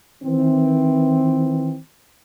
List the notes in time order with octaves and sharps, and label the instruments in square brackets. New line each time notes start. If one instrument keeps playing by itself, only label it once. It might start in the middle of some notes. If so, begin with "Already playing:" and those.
[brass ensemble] D#3 E3 C4